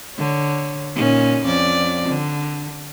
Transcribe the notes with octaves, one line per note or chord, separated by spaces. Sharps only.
D3 C#5
A#2 C#4 D#4
F2 C#4 D5
D3